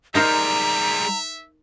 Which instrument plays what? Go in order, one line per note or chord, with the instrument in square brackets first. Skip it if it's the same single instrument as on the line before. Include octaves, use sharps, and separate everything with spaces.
[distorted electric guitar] G3 G#3 [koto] D#4 A#4 C5 [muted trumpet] E5 [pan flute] A#5